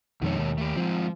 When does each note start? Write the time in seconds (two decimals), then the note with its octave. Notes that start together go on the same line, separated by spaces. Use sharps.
0.22 F2 B2 D#3 G#3 C#5
0.38 D#2
0.58 A3 G4
0.77 F3 G#3 C4